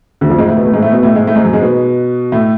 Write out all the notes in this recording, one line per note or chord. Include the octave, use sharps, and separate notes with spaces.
D2 D3
F2 F3
G#2 G#3
A2 A3
B2 B3
A2 A3
G#2 G#3
A2 A3
B2 B3
A2 A3
G#2 G#3
A2 A3
G#2 G#3
F#2 F#3
G#2 G#3
B2 B3
A2 A3